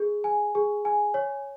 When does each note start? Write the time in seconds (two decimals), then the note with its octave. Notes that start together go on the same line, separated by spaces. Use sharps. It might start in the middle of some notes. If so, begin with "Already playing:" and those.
Already playing: G#4
0.24 G#5
0.55 G#4
0.85 G#5
1.14 C#5